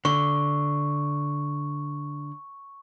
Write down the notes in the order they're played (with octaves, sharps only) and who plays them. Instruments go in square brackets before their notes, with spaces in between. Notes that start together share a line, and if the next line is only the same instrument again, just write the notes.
[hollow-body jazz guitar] D3 [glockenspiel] C#6